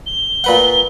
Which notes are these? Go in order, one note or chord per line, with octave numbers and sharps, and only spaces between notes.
G7
A#2 B4 F#5